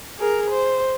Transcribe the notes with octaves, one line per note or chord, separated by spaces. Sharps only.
G#4 A#4
C5